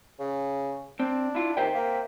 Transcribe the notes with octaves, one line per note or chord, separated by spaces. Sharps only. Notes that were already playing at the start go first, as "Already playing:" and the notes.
C#3
C4 D4
E4 F4
D#2 C5 E5 G5
A#3